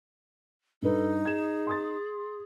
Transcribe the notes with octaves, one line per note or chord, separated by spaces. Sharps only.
G2 D#4 A4 B4
G#4 G#6 E7
C6 D#6 A6